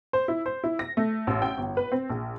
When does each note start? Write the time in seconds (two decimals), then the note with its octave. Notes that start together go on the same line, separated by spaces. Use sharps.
0.13 C5
0.28 E4
0.46 C5
0.64 E4
0.79 A#6
0.97 A3
1.27 A1
1.42 G5
1.58 G1
1.77 B4
1.92 C4
2.10 A#1